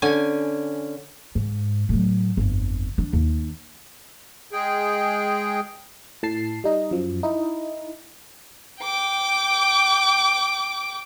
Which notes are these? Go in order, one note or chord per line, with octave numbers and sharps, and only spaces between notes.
D3 C#4 G#5
G#2
A2 F#3
G1 F2
D4
D#2
G#3 G#4 G5
A2 A5 C7
G3 D#4 D#5
F#2 F3
D#4 E4
G5 D6